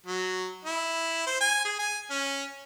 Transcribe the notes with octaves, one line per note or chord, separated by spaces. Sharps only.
F#3
E4
C5
G#5
G#4
G#5
C#4